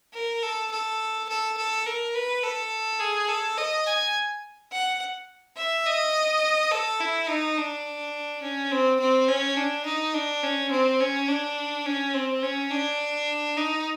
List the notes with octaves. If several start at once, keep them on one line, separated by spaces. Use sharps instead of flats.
A#4
A4
A4
A4
A4
A#4
B4
A4
G#4
A4
D#5
G#5
F#5
E5
D#5
A4
E4
D#4
D4
C#4
C4
C4
C#4
D4
D#4
D4
C#4
C4
C#4
D4
C#4
C4
C#4
D4
D#4